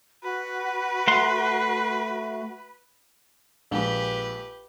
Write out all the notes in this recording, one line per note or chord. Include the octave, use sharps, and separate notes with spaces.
F#4 B4
A3 F#5 C6
A#1 G#3 G4 B4